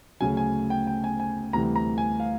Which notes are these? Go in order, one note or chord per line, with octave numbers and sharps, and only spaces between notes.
D2 C#3 F#3 G#5
G#5
G5
G5
G#5
G#5
D2 C3 E3 G3 A#5
A#5
G#5
F5